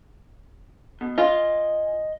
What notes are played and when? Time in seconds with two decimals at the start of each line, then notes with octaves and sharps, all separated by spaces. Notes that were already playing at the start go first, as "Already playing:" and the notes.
1.01 B2
1.18 F4 D#5 G#5 C6